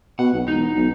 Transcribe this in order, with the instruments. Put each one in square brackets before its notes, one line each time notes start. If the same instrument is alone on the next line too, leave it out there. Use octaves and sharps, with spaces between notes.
[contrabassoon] B2 [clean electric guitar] F#5
[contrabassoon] B1
[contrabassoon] E1 [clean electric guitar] D#4
[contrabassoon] B1